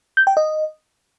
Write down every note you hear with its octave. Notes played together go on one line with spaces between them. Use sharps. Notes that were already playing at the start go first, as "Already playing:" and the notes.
G6
G5
D#5